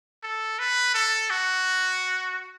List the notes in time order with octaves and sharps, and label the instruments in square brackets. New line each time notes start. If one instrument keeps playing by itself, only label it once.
[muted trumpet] A4
B4
A4
F#4